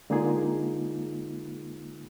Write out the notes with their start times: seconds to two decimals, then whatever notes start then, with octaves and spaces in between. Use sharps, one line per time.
0.10 D3 G#3 A#3 D#4 F4 G#4